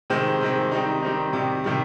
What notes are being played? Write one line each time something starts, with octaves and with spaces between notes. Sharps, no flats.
C3 D#3 G#3 C4
C3 D#3 G#3 C4
D#3 G3 C4 D#4
D#3 G3 C4 D#4
C3 D#3 G3
C3 D#3 G3